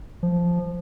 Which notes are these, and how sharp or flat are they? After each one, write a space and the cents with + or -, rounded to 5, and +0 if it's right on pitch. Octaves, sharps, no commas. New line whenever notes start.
F3 -5